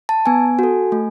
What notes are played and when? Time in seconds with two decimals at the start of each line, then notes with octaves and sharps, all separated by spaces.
0.09 A5
0.26 B3 G#5
0.59 F#4 A4
0.92 A3